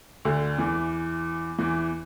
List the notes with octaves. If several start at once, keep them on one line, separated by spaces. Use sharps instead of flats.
D2 D3
E2 E3
E2 E3